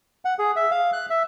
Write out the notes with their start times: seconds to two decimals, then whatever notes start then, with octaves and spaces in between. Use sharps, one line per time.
0.25 F#5
0.39 G#4
0.56 E5
0.71 F5
0.93 F#6
1.10 E5